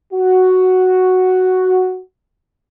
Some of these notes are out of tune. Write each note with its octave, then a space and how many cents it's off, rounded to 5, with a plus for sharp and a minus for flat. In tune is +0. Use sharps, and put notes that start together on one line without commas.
F#4 +0